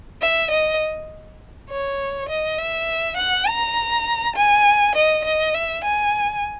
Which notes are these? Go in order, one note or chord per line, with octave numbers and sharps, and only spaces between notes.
E5
D#5
C#5
D#5
E5
F#5
A#5
G#5
D#5
D#5
E5
G#5